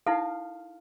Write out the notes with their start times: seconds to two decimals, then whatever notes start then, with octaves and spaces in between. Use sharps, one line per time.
0.07 D#4 E4 A4 F5